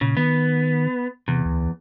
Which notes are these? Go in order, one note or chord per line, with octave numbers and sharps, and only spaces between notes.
A#2 C#3
D#3 B3
E2 C3
D2